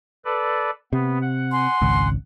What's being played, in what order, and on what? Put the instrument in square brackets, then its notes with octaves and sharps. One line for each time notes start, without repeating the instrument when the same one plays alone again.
[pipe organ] A4 B4 D5
[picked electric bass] C3 [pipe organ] B3
[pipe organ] F#5
[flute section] G#5 C6
[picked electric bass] G#1 C#2